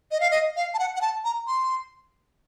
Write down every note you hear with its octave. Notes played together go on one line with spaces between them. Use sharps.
D#5
F5
D#5
F5
A5
F#5
F#5
A5
A#5
C6